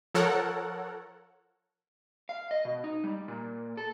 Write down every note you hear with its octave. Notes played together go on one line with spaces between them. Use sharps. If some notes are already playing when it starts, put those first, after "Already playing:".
F3 A4 A#4 C#5 F#5
F5
D#5
B2
D#4
G3
A#2
A4